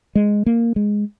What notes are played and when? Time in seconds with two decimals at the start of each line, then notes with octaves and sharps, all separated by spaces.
0.15 G#3
0.46 A#3
0.76 G#3